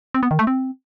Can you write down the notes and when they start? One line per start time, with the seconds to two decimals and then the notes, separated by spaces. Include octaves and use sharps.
0.14 C4
0.23 B3
0.31 D#3
0.39 A3
0.47 C4